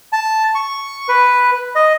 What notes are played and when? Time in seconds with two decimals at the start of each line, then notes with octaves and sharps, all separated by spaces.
0.13 A5
0.55 C#6
1.09 B4
1.75 D#5